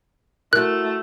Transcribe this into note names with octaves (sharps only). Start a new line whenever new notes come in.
A3 E4 F#4 A#4 F#6